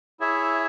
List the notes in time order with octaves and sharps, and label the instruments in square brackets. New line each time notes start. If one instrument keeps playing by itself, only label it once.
[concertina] E4 G#4 C#5 E5